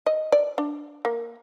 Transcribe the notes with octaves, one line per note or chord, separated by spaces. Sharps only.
D#5
D5
D4
A#3